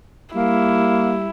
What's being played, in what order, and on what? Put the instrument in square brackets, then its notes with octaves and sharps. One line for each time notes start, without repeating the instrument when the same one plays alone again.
[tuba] G3 [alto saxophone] A#3 [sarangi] E4